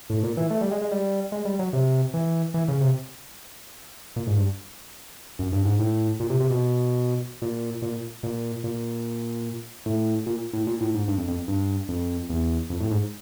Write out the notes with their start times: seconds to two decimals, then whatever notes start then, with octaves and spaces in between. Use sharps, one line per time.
0.10 A2
0.23 A#2
0.37 E3
0.51 A3
0.61 G3
0.71 G#3
0.82 G#3
0.92 G3
1.32 G#3
1.45 G3
1.59 F#3
1.73 C3
2.14 E3
2.54 E3
2.68 C#3
2.81 C3
4.16 A#2
4.27 G#2
4.37 G2
5.39 F#2
5.52 G2
5.65 G#2
5.79 A2
6.20 A#2
6.30 C3
6.40 C3
6.50 B2
7.42 A#2
7.82 A#2
8.23 A#2
8.64 A#2
9.86 A2
10.26 A#2
10.53 A2
10.67 A#2
10.81 A2
10.94 G#2
11.08 G2
11.17 F2
11.28 F2
11.48 G2
11.89 F2
12.29 E2
12.70 F2
12.80 A2
12.91 G#2